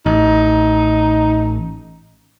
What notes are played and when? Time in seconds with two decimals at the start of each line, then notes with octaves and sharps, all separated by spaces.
0.06 A1 D#4